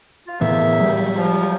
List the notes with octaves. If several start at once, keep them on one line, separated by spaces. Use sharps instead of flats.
F4
A2 E3 A#3 B3 G#4 E5
F#3 G3
F3